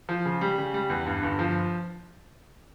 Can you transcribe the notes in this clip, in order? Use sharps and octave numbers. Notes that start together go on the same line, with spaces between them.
F3
C#3
G3
C#3
G3
E2
G2
G1
F3